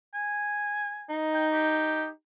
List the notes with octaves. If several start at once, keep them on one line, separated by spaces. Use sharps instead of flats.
G#5
D#4
G5
G4